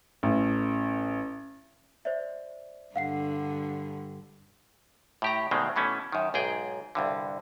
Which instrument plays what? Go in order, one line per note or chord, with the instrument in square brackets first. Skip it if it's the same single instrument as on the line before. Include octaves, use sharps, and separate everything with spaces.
[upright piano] A1
[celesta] C5 D5 E5
[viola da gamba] G2 D3 [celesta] F5 F#5 C7
[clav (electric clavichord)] A2 G4 A#5
D2 B2 D#3 F#3 G#3 C4
B2 E3 A3 C#4
F#2 D#3
B1 G#2 G#4 G5
C2 G2 D3